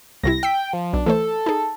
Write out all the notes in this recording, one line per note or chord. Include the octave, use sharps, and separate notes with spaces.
C2 C3 E4 A#6
G5 E6 B6
F3
B1 D4
E3 A3 A4 C5
D#4 G#4